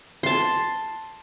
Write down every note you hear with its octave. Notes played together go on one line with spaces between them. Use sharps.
A5 C6